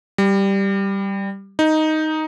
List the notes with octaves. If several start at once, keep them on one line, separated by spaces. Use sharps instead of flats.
G3
D#4